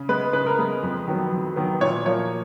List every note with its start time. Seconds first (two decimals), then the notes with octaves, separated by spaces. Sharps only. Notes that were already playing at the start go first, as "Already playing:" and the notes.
Already playing: C#3
0.09 G#3 B3 B4
0.33 C#3 B4
0.46 A#4
0.58 G#3 B3 B4
0.83 F2
1.07 D#3 F#3 B3
1.32 F2
1.56 D#3 F#3 B3
1.81 A#2 C#5
2.06 F3 A#3 C#5